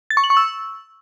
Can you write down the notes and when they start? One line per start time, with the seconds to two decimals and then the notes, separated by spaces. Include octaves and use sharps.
0.10 A6
0.17 C#6
0.24 F#7
0.30 C#6
0.37 E6